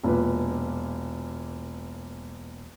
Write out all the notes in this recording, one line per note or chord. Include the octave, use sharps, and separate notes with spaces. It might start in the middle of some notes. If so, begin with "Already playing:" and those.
E1 A#2 B4